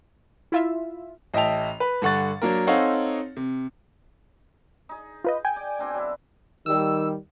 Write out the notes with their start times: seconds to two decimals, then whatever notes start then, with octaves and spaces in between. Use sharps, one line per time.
0.52 E4 F4 E5
1.34 A1 D#5 E5 G5 A5 F7
1.80 B4
2.02 G2 D3 F#5 C#6 A6
2.42 F#3 A#3 D4 A#4
2.67 C4 D#4 A4 C#5 F5 F#5
3.37 C3
4.89 D#4 G#4
5.24 F4 B4 D#5
5.45 G5 G#5
5.56 D5
5.79 B2 C4 D4
5.94 F#3 E4
6.66 D#3 G3 E6